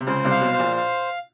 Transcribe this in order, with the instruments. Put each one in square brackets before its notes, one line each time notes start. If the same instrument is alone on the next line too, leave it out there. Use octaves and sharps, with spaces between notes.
[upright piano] C3
[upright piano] C#2 C#3 [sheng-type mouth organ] C5
[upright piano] C2 C3
[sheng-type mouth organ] F5
[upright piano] B1 B2
[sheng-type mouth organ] C5
[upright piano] A#1 A#2
[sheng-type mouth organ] F5